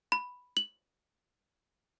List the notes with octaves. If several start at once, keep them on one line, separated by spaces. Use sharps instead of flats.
B5
F#7